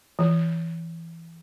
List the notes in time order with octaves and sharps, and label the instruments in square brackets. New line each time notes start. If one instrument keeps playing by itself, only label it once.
[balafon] E3